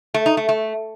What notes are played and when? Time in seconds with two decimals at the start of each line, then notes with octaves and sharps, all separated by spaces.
0.14 A3
0.26 D#4
0.37 A3
0.49 A3